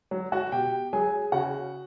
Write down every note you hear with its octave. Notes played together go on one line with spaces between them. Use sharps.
F#3
F#4 F#5
B2 G4 G5
F#3 G#4 G#5
C#3 F#4 F#5